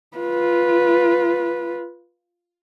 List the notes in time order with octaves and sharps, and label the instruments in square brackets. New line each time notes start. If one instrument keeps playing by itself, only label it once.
[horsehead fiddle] F4 B4